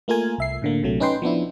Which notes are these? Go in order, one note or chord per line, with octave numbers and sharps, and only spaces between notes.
A3 A#3 F4 A#4 G#5
C2 E5 C7
A2 D3 A#3
A#1 C3 F#3 A3
C#4 D#4 B4 G5 C6
F3 B3 D4 E4